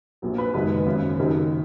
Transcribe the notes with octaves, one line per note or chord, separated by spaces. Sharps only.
A#1 A#2 F#3
B4
F#1 F#2 D#3 G#3 B4
G#1 F#2 C#3
F#1 F#2 D#3 F#3